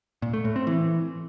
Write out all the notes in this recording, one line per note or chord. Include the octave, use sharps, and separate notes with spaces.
A#2
A3
A2
C4
E3